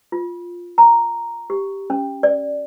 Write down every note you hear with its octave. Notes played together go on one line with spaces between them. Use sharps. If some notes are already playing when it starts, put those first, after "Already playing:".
F4
A#5
G4
C#4
D5